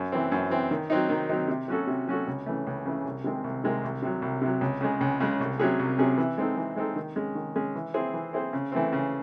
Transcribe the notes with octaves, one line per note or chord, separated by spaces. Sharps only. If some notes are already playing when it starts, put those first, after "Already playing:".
Already playing: F#2
E3 C4
F#2
E3 C4
D#3
F#3 C4 D#4
D#3
F#3 C4 D#4
C3
F#3 C#4 F#4 A4
C3
F#3 C#4 F#4 A4
C#2
C#3 E3 A3
C#2
C#3 E3 A3
C2
C3 D#3 G#3 C4
C2
C3 D#3 G#3 C4
C2
C3 F#3
C2
C3 F#3
C#2
C#3 G#3
C#2
C#3 G#3
C2
C3 F#3 C#4 G#4
C2
C3 F#3 C#4 G#4
E3
G#3 C4 D#4 A4
E3
G#3 C4 D#4 A4
D#3
G#3 C#4 G#4
D#3
G#3 C#4 G#4
E3
C4 E4 G#4 C5
E3
C4 E4 G#4 C5
C#3
E3 A3 C4
C#3